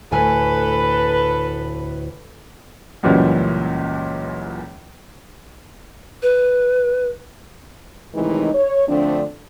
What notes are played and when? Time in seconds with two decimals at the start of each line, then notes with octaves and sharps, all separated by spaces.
0.12 D2 A2 A4 B4 G#5
3.03 C#2 F#2 A#2 E3 F#3 G3
6.22 B4
8.15 A2 C3 D#3 E3 G#3 D#4
8.54 C#5
8.88 D3 F3 A3 C4 D4